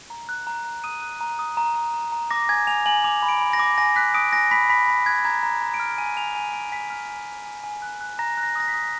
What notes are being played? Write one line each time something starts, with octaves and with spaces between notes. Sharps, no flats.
A#5
F#6
A#5
A#5
D#6 D#7
F#6
A#5
D#6
A#5
A#5
A#5
A#5
D6 A#6
G#5 G#6
G#5 F7
G#5 F#7
D6 F7
B5
D7
B5
A#6
D6
G#5 A#6
F#6 B6
D#6 D7
G#5 A#6
B5 B6
B5 B6
B5
F#6 G#6
A#5 G#6
A#5
A#5
D7
F6
G#5 D#7
G#5 F7
G#5 D#7
G#5 D7
G#5 B6
F6
G#5
G#5
G#5
G#5
F#6
F#6
A#5 A#6
F#6
A#6
D#6 A#6
B6
D#6